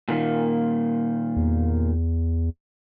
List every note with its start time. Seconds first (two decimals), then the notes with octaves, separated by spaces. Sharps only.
0.08 A#2 D#3 A#3
1.36 E2